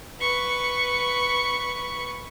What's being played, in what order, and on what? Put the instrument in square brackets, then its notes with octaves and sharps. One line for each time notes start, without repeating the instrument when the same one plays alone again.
[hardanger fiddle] B4 C#6